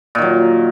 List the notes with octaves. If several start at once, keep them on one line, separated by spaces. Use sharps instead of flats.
A#2 D#3 F#3